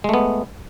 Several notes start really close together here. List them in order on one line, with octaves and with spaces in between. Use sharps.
G#3 A3 B3